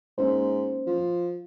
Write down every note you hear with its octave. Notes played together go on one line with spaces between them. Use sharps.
G#2 A#3 C#4 C5
F3